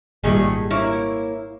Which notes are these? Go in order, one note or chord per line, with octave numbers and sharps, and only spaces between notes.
G#1 A#2 D#3 G3 A3 G#4
A#3 E4 C#5